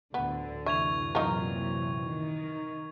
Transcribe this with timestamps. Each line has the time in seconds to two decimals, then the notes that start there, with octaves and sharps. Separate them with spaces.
0.14 D2 A2 D3 B3
0.66 F#2 C3 E3 E5 C#6 G#6 F7
1.15 A#2 F#3 D#4 F4 A#4 C#6
2.06 D#3